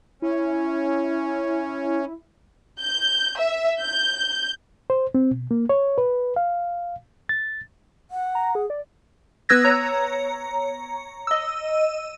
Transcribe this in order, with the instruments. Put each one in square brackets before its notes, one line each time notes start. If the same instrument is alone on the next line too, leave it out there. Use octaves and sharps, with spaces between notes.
[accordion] C#4 [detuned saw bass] E4
[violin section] G6
E5
G6
[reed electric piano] C5
C4
B2
A#3
C#5
B4
F5
A6
[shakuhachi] F#5
[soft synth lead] A#5
G#4
D5
[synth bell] B3 B4 E6 F#6 G#6 A#6
C#5 A#5
D#5 E6